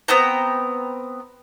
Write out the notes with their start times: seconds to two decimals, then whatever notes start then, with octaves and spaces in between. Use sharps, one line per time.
0.08 B3 C4 G5 A#5